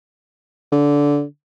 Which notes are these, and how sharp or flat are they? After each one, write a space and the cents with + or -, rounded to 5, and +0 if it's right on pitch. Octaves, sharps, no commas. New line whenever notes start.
D3 -15